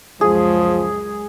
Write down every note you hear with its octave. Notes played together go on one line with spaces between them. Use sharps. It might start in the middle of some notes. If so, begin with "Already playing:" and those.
C#2 F#2 F3 G#4